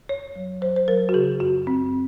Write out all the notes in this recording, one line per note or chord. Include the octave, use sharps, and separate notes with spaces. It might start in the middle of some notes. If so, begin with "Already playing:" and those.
F#2 C#5
F#3
F#3 C5
C5
F#3 A#4
F#4
C#3 G#4
F#2 F#4
F#2 C4